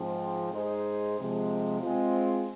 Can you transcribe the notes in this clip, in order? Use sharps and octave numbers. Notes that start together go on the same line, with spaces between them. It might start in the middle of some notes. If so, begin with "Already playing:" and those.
Already playing: G#2 F3 C4
G#2 G#3 D#4 G#4 C5
C3 F3 G#3
G#3 C4 F4